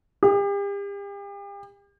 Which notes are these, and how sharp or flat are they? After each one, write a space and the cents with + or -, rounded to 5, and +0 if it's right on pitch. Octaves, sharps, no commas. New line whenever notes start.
G4 +40